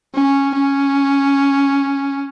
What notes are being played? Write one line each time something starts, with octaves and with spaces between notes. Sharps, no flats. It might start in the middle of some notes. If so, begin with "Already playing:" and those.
C#4
C#4